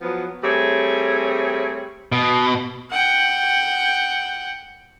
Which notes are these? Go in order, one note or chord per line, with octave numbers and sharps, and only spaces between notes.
F3 F#3 B3
G3 A3 C4 G#4 C#5
B2
F#5 G5